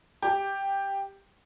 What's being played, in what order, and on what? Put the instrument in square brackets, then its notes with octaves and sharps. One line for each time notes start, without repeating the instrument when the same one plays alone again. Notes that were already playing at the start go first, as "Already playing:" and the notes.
[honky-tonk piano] G4